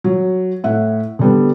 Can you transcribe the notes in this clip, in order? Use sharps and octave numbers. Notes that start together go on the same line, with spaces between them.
F#3
A2 E5 F#5
D3 G3 B3